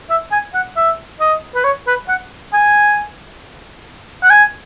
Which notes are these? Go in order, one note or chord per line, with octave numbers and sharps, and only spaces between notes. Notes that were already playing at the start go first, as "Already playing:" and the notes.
E5
G#5
F#5
E5
D#5
B4
C#5
B4
F#5
G#5
F#5
G#5